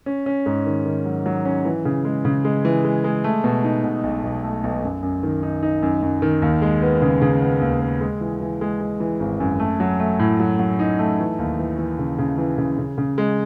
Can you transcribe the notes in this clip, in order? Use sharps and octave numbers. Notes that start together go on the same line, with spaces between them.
C#4
C#4
G#2
D#3
D#3
F#3
F#3
C#4
E3
C#3
G#3
C#3
G#3
E3
G#3
G#3
A3
B2
D#4
B2
B1
B1
A3
B1
F#2
F#2
D#3
D#4
D#4
F#2
F#2
D#3
D#2
G#3
B3
C#3
C#3
B3
D#2
B3
G#3
E3
E3
G#3
G#3
E3
G#1
F#2
A3
F#3
A3
A2
F#3
F#3
D#4
A3
E3
D#2
E3
E3
C#3
C#3
E3
C#3
C#3
C#3
G#3